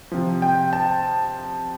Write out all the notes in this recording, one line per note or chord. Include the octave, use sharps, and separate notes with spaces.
C3 F3
G5
A5